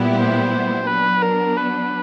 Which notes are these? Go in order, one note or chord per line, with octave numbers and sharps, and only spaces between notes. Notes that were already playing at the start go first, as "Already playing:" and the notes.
Already playing: A#2 G3 B3 E4 G4
C5
F#3 B3 D4 B4
A#4
B4